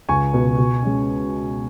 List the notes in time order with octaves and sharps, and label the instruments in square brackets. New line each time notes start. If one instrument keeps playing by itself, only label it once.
[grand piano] C#2 G#5 C#6
B2 B3
B2
G#3 C#4